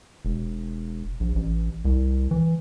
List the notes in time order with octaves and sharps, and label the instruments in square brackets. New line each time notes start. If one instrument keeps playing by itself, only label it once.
[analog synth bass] E1
A#1
A1
C2
E3